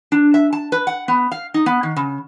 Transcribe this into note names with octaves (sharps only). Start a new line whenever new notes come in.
D4
E5
A5
B4
F#5
B3
F5
D#4
B3
D#3
C#3